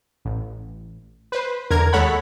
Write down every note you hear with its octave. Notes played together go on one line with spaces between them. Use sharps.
A1
B4 C5
E2 D3 A#4 G#6
D#2 G#3 A4 C#5 F#5 B5